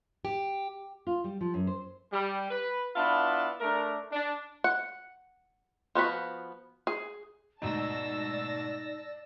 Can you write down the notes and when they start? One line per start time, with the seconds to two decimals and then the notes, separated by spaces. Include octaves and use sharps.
0.25 G4
1.07 F4
1.24 G3
1.41 F3
1.54 F#2
1.67 C5
2.13 G3
2.51 B4
2.96 B3 D4 E4 F4 A5
3.60 A3 D4 A#4
4.12 D4
4.64 F#5
5.95 F3 B3 F#4 B5
6.87 G#4
7.62 D2 G#2 B2 D#4 D5 A5 E6 A#6